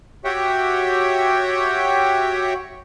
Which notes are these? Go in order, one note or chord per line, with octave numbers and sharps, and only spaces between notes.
F#4 G4 C#5 E5 F#5 G5